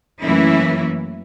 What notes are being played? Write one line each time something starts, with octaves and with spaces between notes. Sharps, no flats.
F#2 E3 A3 A#3 C#4 E4